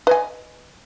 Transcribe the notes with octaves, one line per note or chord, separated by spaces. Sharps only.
B4 D#5 G#5